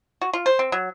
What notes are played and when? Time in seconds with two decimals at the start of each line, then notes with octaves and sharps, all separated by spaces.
0.21 F#4
0.33 F4
0.46 C5
0.59 C4
0.72 F#3